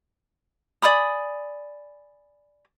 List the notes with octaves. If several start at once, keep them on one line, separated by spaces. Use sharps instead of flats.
D5 G#5 B5 D#6